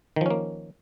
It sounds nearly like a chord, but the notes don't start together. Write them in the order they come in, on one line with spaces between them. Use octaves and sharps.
D#3 F3 C#4 A#3